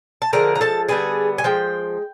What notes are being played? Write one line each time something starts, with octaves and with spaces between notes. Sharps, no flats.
A5
D3 F3 G#3 A#4 A#5
A#5
A4 A5
D3 G3 B3 G#4 G#5
G#5
F3 G#3 G5